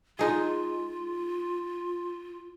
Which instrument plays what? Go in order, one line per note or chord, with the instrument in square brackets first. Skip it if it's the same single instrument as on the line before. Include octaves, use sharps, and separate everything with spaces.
[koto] G#3 D#4 G#4 [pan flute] F4